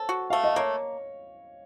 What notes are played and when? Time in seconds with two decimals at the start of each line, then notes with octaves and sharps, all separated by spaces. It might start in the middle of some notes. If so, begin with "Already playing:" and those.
Already playing: A4 C5 C#5
0.09 F#4
0.30 A3 F5
0.44 D#5
0.56 A#3 C#5